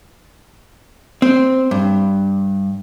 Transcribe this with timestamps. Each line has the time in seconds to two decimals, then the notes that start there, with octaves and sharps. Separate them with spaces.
1.22 C4
1.71 G2